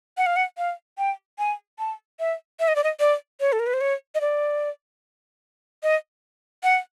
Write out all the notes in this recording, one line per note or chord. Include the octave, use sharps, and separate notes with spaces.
F#5
F5
F#5
F5
G5
G#5
A5
E5
E5
D#5
D5
D#5
D5
C#5
A4
A#4
B4
C5
C#5
D#5
D5
D#5
F#5